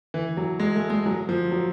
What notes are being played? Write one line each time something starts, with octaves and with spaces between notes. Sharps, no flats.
E3
F#3
G#3
A3
G#3
F#3
F3
F#3